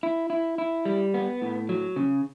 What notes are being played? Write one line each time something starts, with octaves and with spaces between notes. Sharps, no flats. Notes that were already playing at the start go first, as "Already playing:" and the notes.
E4
E4
E4
G3
B3
A2
F#3
C#3